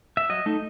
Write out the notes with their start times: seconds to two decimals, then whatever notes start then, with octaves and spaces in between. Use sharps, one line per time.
0.17 E5
0.29 F#3 D#5
0.46 A3 D#4